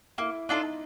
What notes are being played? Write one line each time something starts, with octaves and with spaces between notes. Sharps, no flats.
A#3 E4
D4 D#4 F4 A4